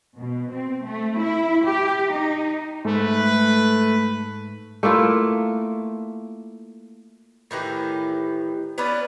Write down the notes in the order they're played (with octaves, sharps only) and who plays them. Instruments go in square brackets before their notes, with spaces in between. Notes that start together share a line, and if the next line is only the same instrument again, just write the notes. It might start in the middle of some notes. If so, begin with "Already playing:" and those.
[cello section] B2
C4
A3
E4
G4
D#4
[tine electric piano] G#2 [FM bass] A3 [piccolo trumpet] B4
[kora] A3 A#3 E4 F4
[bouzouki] A2 D#3 E3 G4
B3 C#4 D4 B4